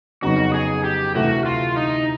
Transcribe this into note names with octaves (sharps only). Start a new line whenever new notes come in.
F2 C#3 F#3 B3 D#4 F#4
G#4
G4
D2 C3 E3 A3 C4 F#4
F4
D#4